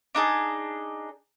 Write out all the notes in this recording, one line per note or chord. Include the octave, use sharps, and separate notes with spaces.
D4 D#4 G#4 A5